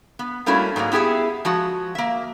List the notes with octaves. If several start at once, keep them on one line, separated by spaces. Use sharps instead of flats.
B3
G3 A3 A#3 C#4 E4 F#4
G#2 F#3 G#3 A#3
B3 E4 G4 G#4 E5
F3 G#3 F#4
A#3 E5